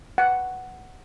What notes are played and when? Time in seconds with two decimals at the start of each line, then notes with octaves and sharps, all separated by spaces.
0.18 F#5